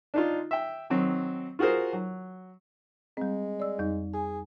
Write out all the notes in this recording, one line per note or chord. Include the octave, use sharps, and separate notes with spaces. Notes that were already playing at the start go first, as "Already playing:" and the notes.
D4 D#4 F4
E5 G5
D#3 F#3 C4
F4 F#4 G#4 A#4 C5
F#3
G3 G#3 C4
D5 E6
F2 G3 D#4
G#4 G#5